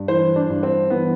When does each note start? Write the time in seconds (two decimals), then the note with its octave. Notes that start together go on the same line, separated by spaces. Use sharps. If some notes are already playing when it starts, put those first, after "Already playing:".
Already playing: G2
0.08 E3 C5
0.36 D4
0.50 G2
0.63 C4
0.90 E3 B3